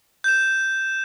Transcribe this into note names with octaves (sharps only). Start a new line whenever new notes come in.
G6 E7